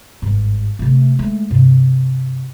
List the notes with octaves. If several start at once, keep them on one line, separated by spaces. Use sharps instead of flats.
G#1 G2
C3 A3
G#3 A3
G2 C3